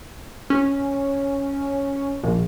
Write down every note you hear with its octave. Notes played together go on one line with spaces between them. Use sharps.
C#4
A#1